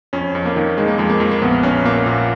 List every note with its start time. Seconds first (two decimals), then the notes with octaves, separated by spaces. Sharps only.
0.13 F2 C#4
0.35 F2
0.45 A#3
0.56 D#3
0.77 D#3 G#3
0.88 A#3
0.98 F2 G#3
1.10 A#3
1.20 F2
1.31 A#3
1.42 A#1 B3
1.63 A#1 C#4
1.85 A#2 A#3
2.06 A#2